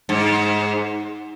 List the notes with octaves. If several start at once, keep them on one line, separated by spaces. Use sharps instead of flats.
G#2